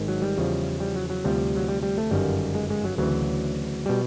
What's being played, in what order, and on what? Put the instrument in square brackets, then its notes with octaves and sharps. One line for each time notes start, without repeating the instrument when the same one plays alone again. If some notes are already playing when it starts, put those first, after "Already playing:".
Already playing: [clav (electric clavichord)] G#1 G#2 D#3
F#3
G3
E2 C#3 F3
G3
F#3
F#3
D2 C3 F3 G3
F#3
G3
G3
A3
G1 F#2 D#3 G3
G#3
G#3
F#3
D2 C#3 E3 F#3
B2 G3